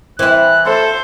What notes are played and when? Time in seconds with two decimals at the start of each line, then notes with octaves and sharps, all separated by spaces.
0.19 E3 C4 E4 F#6
0.66 A3 A4 C5